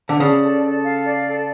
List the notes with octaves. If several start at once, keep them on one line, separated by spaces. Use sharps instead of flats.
D3
C#3 D5
A4
A4
F5
D5
A4